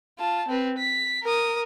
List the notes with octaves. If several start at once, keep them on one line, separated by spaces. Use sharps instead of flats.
F4 A5
C4 B4
B6
A#4 D#6